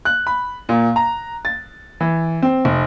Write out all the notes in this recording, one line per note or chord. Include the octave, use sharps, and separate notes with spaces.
F#6
B5
A#2
A#5
A6
E3
C4
F1